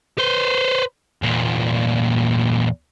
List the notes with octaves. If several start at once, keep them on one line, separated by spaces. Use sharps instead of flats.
B4 C5
E2 A#2